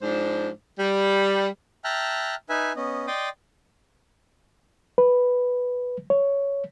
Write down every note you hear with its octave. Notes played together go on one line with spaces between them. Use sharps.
G#2 F3 D4 C5
G3
E5 G5 A5 A#5 F6 F#6
D#4 B4 E5 G#5
B3 C#4 D#5
D5 D#5 G5 C6 D6 D#6
B4
C#5